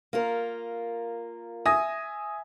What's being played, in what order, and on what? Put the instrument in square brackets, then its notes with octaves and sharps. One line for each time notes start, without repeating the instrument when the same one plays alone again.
[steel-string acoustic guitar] A#3 F4 A#4
[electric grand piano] E5 G#5 A#6 [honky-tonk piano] D#6